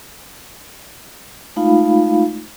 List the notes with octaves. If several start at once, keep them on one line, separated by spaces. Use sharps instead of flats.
G#3 A3 D#4 F4 F5 B5